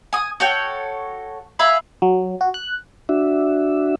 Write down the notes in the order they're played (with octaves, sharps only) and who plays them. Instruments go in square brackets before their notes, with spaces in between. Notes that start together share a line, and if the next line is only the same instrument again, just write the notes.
[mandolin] G#5 D#6
F#4 A4 C#5 G5
E5 F5 G#5 B5
[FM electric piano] F#3
F#4
F#6
[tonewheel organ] D4 F#4 E5